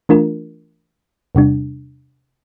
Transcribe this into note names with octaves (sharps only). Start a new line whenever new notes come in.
E3 A3 D4 F4 A#4
E2 C3 G3 D4